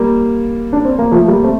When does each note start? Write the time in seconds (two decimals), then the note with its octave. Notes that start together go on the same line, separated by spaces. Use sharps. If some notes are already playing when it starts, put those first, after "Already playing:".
Already playing: G3 A#3
0.73 D4
0.85 C4
0.99 A#3
1.12 F3 A3
1.28 G3 A#3
1.43 A3 C4